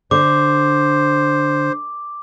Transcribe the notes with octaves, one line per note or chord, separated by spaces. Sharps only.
D3 C5 D6